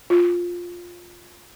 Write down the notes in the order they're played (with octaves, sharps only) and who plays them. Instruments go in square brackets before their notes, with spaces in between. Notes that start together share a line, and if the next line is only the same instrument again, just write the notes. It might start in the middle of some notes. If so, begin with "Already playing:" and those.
[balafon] F4